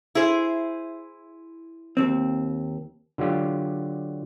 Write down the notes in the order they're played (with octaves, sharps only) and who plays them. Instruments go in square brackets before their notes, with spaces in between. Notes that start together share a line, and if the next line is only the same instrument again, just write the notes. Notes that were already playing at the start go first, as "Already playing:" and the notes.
[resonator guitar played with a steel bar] E4 G#4 C5
[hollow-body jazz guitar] D#2 C4
[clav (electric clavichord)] D3 F#3 F4 G4